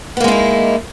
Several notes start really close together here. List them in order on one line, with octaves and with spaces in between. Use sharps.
B3 A#3 G#3 E4 D#4